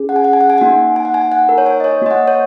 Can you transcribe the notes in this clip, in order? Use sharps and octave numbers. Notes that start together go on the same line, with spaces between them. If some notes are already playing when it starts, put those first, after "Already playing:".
Already playing: C#4 G#4
F#5
G#5
F#5
G#5
F#5
G#5
A#3 D#4 F#4 F#5
G#5
F#5
G#5
F#5
A#4
C#5
G#5
D#5
C#5
A#3 F#4 D#5
F#5
C#5